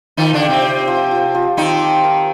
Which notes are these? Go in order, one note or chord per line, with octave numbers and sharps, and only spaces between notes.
D#3 F3 D#4
D3 D4
G4
C3 C4
G4
F3
F3
F3
D#3 C4 D#4
G4
A#4